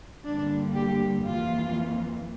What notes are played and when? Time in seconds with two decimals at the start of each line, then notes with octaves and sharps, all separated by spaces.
0.24 G2 D3 G3 A#3 D4
0.75 G4
1.25 F2 E3 A#3 F4